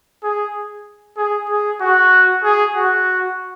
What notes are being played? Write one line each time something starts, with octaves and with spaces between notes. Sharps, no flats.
G#4
G#4
G#4
F#4
G#4
F#4